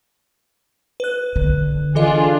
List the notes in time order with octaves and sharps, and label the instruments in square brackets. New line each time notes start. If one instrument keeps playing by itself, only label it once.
[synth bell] B4 F#6
[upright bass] D3
[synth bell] E3 A4 D#5 [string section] D4 F4 G#4